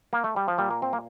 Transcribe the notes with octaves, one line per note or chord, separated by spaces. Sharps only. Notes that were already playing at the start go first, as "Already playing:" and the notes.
A#3
A3
G3
F3
A#2 G3
A#3
C4
A#3